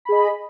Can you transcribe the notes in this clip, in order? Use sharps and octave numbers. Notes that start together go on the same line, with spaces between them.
G#4 D#5 B5